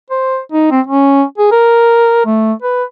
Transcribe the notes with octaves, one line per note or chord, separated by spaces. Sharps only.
C5
D#4
C4
C#4
G#4
A#4
A3
B4